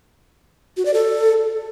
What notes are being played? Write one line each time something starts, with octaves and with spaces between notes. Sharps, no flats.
F#4
D5
A4